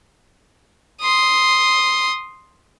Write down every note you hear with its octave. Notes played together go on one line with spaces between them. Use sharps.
C6 D#6